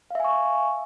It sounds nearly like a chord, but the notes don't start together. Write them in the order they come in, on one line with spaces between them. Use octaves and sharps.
F5 E5 G#5 C#6